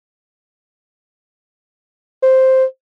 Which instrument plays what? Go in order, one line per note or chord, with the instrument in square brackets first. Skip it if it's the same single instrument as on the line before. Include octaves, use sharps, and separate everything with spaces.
[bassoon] C5